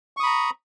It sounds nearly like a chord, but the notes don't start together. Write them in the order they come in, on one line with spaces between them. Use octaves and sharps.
C#6 D#6 B5 A#5